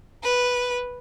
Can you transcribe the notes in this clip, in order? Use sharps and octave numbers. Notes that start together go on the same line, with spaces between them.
B4